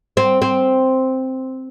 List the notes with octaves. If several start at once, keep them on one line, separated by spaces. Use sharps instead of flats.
C4
C4